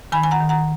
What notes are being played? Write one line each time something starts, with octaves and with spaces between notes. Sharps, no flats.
D#3 G#5 B5
G#5
F#5 A#5
D#3
F#5 A#5